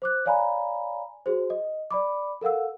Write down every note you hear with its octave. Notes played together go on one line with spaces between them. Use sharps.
C5 D6 F#6
C#5 D5 F5 G#5 A#5 B5
F#4 G#4 C5
D#5
D5 B5 D6
A4 A#4 F5 F#5 E6